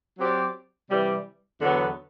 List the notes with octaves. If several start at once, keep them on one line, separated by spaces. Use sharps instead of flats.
F#3 C4 G4 D5
C3 E3 G3
E2 D3 F#3 B3